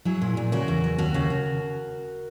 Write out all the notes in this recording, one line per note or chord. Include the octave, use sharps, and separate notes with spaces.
F#3 E4 G#4
A#2
A#2
C#3 F#4 A#4
E2
F#3
D#2 F#4 A#4
C#3
C#3